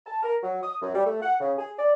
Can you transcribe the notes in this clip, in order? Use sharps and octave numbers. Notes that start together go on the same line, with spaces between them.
A5
A#4
F#3
D#6
F#2
G3
A3
F#5
C#3
G#4
D5